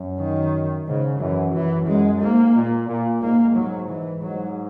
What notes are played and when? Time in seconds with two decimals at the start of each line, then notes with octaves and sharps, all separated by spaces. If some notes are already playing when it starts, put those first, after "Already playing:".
Already playing: F#2
0.20 D#3
0.87 G#2 C#3
1.19 F#2 E3
1.53 F#2 E3
1.87 F#2 G#3
2.21 G#2 A#3
2.55 A#2
2.88 A#2
3.22 G#2 A#3
3.56 F#3
3.89 E3
4.22 G#2 F#3